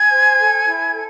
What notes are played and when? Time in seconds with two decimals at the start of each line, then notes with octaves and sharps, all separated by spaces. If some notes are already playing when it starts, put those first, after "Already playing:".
Already playing: G#5 G#6
0.11 C5
0.38 A4
0.65 E4
0.93 A4